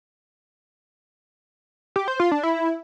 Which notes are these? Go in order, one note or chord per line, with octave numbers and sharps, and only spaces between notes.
G4
C5
F4
D4
E4